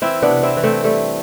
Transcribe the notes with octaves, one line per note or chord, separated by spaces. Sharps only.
E3 C4 E4
B3 D4
C3
C4 E4
E3
A3 C4
G3 A3